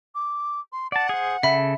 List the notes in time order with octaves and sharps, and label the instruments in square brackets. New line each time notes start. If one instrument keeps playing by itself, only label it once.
[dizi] D6
C6
[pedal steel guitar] D5 A5 [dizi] F#5
[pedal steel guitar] G#4 C5
[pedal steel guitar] C#3 A4 [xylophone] E5 B5